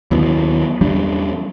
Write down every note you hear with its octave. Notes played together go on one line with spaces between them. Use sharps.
D#2 E3 F#3 B3
E2 G3 D4